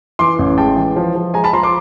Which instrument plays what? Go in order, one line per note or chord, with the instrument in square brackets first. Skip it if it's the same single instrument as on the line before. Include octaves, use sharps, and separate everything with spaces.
[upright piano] E3 C6 D6
A1
G#3 G5 A5
E3
F3
F3
G#3 G#5 A#5
A5 B5
F3 A#5 C6
C6 D6